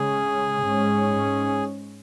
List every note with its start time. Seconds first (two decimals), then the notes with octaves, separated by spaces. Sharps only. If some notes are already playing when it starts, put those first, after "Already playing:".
Already playing: C#3 G#3 C#4 G#4
0.63 G#2 G#3 C#4